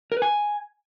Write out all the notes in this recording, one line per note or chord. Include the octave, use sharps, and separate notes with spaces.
A#4
B4
G#5